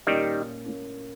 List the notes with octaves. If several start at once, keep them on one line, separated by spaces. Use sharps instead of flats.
A#2 D#3 G3 A#3 C#4
A#2 A#3 C#4